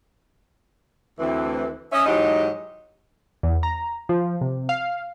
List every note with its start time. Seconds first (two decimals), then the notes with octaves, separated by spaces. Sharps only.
1.19 D2 E3 C4
1.92 C#4 D#5 E5
2.06 G#2 E3 F#3 D#4 G4 D#5
3.43 E2
3.63 A#5
4.09 F3
4.41 C3
4.69 F5